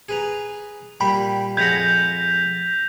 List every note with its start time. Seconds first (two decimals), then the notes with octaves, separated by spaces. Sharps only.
0.09 G#4 B4 A#5
1.00 A#2 G3 G5 B5
1.57 F2 G#3 F#5 G6 G#6 A#6 B6 F7